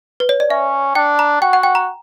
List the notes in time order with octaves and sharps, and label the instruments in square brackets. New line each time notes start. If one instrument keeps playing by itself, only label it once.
[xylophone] B4
C#5
D5
[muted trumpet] C#4 [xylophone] E5
[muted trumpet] D4 [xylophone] G5
[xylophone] A#5
[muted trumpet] F#4 [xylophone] G5
[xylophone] F#5
G5
A#5